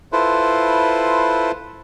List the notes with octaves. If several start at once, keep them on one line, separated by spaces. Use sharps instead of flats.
E4 F4 A4 B4 C5